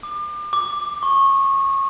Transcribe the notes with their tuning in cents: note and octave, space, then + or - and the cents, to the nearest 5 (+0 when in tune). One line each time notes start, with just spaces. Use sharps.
D6 +35
D6 +5
C#6 -25